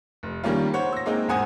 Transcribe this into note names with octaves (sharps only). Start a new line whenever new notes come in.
F1
D#3 G3 A#3 C#4 F4
C5 C#5 F#5
E6 A#6
G#3 A#3 C4 D#4
E1 G#2 C5 F#5 G#5 D#6